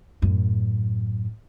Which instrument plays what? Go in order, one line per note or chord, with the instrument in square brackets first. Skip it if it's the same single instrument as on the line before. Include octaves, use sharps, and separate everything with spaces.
[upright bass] F#2 A2